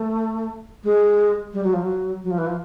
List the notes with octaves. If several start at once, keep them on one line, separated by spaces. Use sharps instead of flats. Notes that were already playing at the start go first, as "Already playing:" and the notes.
Already playing: A3
G#3
G3
F#3
F3
F#3
F#3
F3
E3
F3